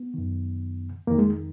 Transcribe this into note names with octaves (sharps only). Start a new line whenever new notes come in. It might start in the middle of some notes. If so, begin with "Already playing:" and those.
Already playing: B3
F#2 D#3
F2 D#3 A#3
G#3